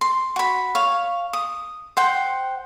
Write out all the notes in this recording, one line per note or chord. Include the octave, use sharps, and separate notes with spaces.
C6
F#4 B5
C#5 F5
D#6
C5 F#5 G5